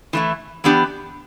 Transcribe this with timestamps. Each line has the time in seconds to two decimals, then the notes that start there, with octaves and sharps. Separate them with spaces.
0.13 E3 A3 E4
0.64 E3 B3 D4 G4